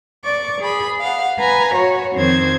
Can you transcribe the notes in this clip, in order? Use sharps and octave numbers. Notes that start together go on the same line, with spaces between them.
D5 C#6 D6
G#4 B5
F5 F#5
B4 G#5 A#5
F#4 C#5
F2 D#3 C4 C5 G#6